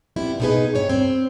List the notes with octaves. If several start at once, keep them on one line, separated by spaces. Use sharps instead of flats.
G3 B3 C4 E4
B2 A#3 D#4 E4 G#4 B4
G2 C#5 G5
C4